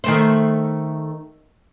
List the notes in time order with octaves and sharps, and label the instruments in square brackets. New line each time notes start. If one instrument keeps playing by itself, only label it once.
[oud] D#3 A3 C5